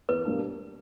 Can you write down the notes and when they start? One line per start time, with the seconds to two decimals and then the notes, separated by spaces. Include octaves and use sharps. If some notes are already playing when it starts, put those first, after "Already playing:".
0.09 E2 B4
0.25 B2 G3 A#3 D4